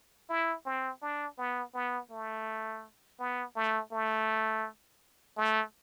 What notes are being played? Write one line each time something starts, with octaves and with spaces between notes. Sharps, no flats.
E4
C4
D4
B3
B3
A3
B3
A3
A3
A3